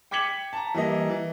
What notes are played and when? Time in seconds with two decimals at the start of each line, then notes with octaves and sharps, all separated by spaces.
0.11 G5 D6 G#6 B6 C#7 F#7
0.53 A5 A#5
0.74 E3 G3 A#3 D#5
1.09 E3